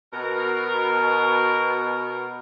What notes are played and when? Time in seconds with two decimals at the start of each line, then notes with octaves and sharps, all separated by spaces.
0.13 B2 A#4